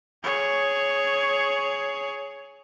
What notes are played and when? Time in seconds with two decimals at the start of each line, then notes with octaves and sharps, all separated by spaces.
0.24 G#4 C#5